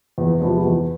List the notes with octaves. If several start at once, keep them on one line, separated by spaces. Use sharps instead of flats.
E2
C3 F3 G#3 B3
E2